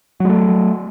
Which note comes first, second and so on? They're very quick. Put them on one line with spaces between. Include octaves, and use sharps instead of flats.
F#3 G#3 A3